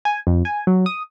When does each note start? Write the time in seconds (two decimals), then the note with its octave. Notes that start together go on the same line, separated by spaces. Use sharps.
0.05 G#5
0.27 F2
0.45 G#5
0.67 F#3
0.86 D#6